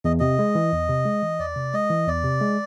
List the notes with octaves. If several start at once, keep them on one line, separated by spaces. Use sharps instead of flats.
E2 D#5
C3 D#5
G#3
E3
E2
C3
G#3
E3
E2 D5
C3
G#3 D#5
E3
E2 D5
C3
G#3